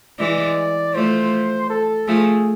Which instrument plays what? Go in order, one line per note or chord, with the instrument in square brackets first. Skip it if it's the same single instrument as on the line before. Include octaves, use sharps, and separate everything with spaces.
[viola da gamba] E3 G#3 [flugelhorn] D5
[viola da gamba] F3 A3 [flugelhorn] C5
[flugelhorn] A4
[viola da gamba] F3 A3 [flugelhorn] G#4